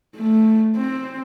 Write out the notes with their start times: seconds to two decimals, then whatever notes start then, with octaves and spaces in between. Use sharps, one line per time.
0.16 A3
0.76 C4